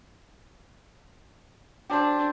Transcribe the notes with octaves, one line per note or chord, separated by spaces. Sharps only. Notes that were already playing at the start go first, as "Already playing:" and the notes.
D4 G4 A4 C5